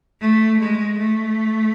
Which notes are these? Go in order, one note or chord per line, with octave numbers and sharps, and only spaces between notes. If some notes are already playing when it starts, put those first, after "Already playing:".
A3
G#3
A3